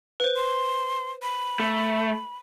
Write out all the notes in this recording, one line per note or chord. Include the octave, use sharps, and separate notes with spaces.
B4 C5
C6
B5
A3